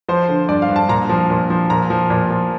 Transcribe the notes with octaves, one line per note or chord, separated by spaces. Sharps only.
F3 C5
D3
G2 D5
F5
G2
A5
A#2 A#5
F3
A#2
F3
A#2 A#5
F3
A#2
F3